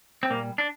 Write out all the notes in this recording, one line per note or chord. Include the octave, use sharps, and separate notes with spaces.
C4
A#2 G3 A#3
D4